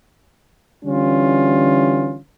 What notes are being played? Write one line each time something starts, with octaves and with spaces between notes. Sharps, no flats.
D3 E3 G3 C#4 F4